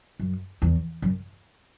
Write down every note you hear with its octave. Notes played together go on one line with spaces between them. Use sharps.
F#2
E2
F#2